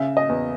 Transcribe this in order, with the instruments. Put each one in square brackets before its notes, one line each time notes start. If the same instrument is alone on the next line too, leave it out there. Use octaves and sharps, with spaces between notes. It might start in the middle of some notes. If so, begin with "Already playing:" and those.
Already playing: [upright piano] C#3 E5
D#5
E2